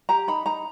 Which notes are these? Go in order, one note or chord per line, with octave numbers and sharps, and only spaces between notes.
G4 A#5
D#4 B5
D#4 A#5